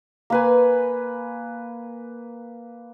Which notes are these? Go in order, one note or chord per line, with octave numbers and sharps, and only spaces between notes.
A#3 B4 G#5